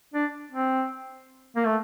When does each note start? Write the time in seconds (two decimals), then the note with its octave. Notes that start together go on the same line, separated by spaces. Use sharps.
0.14 D4
0.52 C4
1.56 A#3
1.65 A3